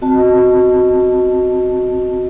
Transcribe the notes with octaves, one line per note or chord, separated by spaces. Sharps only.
C4 F#4 D#5 A5